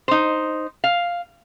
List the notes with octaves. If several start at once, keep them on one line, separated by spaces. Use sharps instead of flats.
D#4 C5
F5